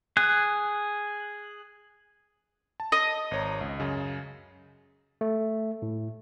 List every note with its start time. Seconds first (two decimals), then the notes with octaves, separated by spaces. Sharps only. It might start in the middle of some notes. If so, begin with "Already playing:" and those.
0.17 G#4 F#6
2.80 A5
2.92 D#5
3.31 G#1 C#5 A#5
3.61 C#2
3.80 F#2 C#3
5.21 A3
5.82 A2